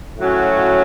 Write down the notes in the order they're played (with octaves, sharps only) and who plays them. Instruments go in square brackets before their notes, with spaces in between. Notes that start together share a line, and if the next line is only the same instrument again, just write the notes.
[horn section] A2 F#3 C#4 F#4